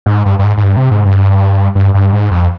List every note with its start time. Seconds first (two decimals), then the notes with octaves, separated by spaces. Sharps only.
0.06 G#2
0.26 G2
0.39 G2
0.44 G#2
0.57 G#2
0.63 G2
0.77 C3
0.91 G#2
1.05 G2
1.75 G2
1.94 G2
2.12 G#2
2.31 F2